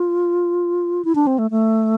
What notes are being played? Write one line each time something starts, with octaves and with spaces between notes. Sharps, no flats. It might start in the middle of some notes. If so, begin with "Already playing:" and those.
Already playing: F4
E4
D4
C4
A3
A3